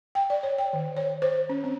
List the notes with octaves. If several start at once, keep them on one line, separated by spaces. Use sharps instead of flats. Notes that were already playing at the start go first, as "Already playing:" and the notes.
G5
D5
C#5
G5
D#3
C#5
C5
C#4
C4